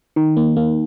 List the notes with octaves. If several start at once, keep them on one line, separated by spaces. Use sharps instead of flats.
D#3
A#3
A#3